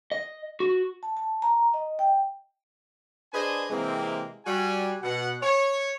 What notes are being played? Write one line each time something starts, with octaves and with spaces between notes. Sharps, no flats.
D#5
F#4
A5
A5
A#5
D#5
G5
D4 G#4 B4 C5 D#5 G#5
C3 E3 G#3 A#3 C4
G3 F#4 G#5
B2 F#5
C#5